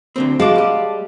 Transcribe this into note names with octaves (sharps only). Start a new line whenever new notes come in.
D2 D3 C4
G#3 F#4 F5 A5 D6
G3 G4